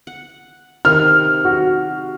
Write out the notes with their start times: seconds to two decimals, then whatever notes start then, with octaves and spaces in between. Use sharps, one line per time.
0.07 F#5
0.85 C3 D#3 C4 F6
1.45 F#4